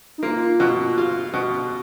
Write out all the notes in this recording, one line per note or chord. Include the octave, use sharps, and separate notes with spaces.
D#4
A#3 F4
B2
F4
B2